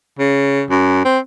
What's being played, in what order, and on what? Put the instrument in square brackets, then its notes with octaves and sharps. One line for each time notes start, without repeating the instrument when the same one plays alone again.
[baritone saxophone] C#3
F#2
C4